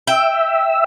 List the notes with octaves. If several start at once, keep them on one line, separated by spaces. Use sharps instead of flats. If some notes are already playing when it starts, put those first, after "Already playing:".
E5 G5